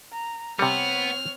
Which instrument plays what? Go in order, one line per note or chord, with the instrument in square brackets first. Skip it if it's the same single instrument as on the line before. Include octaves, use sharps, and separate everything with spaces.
[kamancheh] A#5
[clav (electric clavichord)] C3 G3 [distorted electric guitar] B3 [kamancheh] C4 C#5 [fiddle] F6